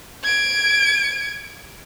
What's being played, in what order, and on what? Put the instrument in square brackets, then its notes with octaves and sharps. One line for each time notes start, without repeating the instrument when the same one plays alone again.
[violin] G#6 D7